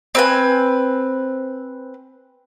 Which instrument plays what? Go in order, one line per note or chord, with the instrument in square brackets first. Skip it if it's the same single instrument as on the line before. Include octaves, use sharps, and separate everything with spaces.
[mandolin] C4 B4 G#5